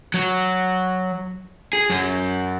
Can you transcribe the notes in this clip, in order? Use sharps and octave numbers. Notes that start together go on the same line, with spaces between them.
F#3
G#4
F#2